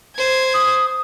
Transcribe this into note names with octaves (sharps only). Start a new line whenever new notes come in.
C5 G#6
D#6